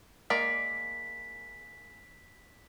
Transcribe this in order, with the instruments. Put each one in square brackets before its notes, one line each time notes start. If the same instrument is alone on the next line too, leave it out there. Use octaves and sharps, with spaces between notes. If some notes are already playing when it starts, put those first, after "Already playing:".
[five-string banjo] G#3 A#3 D5 [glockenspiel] B6